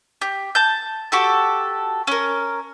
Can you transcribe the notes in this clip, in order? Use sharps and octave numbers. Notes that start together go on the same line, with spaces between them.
G4
A5 G6
F#4 G4 A4
C#4 A#4